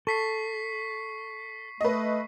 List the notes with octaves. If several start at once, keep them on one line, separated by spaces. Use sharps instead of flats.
A4 C#6 B6 C7
A3 B4 D#5